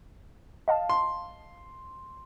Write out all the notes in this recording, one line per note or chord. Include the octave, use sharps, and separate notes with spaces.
D#5 F5 A5
C6